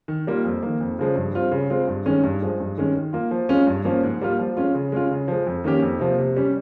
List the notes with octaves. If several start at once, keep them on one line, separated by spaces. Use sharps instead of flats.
D#3
G3 A#3 F4
F2
D#3 A#3
F2
C#3 F3 G#3
G2
G3 C4 F4
C#3
G#3 C4 F4
G2
D#3 G#3 C#4
G2
F3 G#3
G2
D#3 G#3 C#4
D#3
A#3 F4
F3
G#3 C#4 F4
G2
F3 A#3 C#4
G#2
G3 A#3 F4
F3
G#3 C#4 F4
C#3
G#3 C#4 F4
C#3
F3 G#3
F2
D#3 A#3 C#4 G4
F2
C3 F3 A#3
C3
G3 C#4